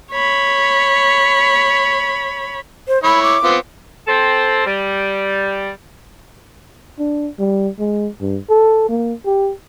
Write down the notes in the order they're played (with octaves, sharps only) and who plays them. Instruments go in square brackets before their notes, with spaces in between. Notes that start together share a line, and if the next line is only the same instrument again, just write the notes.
[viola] C#5 B5
[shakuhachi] C5
[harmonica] E4 C#5 [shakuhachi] B5
[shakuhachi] D6
[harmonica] B3 C4 F4
[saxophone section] C4 A4
G3
[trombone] D4
G3
G#3
G2
A4
A#3
G4